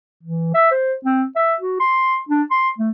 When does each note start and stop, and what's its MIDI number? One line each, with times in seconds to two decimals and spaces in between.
0.23 0.52 52
0.55 0.70 76
0.71 0.94 72
1.05 1.24 60
1.36 1.55 76
1.61 1.77 66
1.80 2.17 84
2.29 2.43 62
2.51 2.69 84
2.78 2.91 57